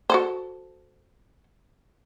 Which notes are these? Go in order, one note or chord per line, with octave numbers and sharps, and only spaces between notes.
F#4 A4 C5